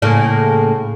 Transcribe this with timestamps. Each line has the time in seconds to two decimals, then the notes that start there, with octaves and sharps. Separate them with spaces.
0.02 A2 C#3 A#3